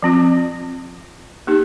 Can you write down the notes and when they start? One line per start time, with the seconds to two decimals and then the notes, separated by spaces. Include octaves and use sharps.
0.02 F3 C4 F4
1.47 A#3 D#4 G4